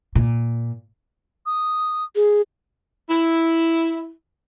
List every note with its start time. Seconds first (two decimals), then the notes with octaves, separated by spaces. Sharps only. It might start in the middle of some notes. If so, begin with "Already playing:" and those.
0.15 A#2
1.46 D#6
2.16 G#4
3.10 E4